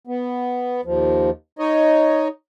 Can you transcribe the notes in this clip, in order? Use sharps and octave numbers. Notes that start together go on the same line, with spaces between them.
B3
D#2 F3
D#4 C#5 D#5